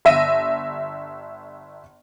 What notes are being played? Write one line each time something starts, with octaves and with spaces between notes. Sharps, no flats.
G1 E5 A#6 D#7